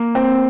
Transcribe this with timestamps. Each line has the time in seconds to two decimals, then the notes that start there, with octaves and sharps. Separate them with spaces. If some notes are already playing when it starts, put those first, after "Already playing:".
Already playing: A#3
0.15 C4